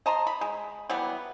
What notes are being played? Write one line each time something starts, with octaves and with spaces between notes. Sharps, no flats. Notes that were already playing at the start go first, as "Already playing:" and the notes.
D#5 A5 A#5 C6
B5
G#3
E3 F#3 G3 B3